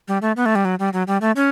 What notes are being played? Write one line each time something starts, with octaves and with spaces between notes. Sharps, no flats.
G3
A3
B3
A3
G3
F#3
G3
F#3
G3
A3
C#4